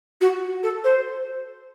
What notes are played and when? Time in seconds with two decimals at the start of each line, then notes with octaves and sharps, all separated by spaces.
0.21 F#4
0.63 A4
0.84 C5